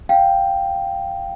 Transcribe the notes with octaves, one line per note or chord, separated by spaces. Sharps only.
F5 G5